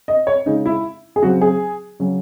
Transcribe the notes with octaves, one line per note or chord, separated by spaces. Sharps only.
D#5
C#5
C#3 G#3 C#4 D#4
E4
G#4
C#3 F#3 C4 F#4
G#4
C#3 F#3 C#4